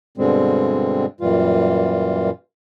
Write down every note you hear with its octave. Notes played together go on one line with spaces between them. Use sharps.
G2 B2 D3 G3 G#3 C4
F#2 A#2 E3 G3 F4